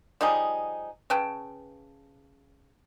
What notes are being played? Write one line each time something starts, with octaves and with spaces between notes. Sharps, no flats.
F3 G3 D#4 G#4
C#3 B4 G5 A5